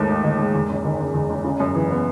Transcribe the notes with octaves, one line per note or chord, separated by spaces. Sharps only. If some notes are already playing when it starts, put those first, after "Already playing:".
Already playing: D#2 G#2 D#3 A3
D#4
D#3
G#2
E2
F#1
D#3
F#1
E2
F#1
C#3
F#2
E3
B3